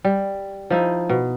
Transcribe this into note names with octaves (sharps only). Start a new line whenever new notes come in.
G3
F3 D#4 E4
B2